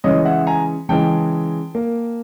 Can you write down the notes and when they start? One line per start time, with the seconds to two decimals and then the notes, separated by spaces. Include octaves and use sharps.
0.04 C#3 E3 G#3 C#5 D#5
0.25 E5 F#5
0.47 G#5 A#5
0.89 C#3 E3 G#3 G5 A5
1.75 A#3